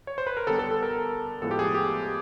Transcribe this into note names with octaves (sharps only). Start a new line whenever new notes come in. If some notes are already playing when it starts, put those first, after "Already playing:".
C#5
C5
B4
A#4
D3 G3 B3 A4
A4
A4
A#4
A2 F3 G#3 B3 A4
G4
G#4
G4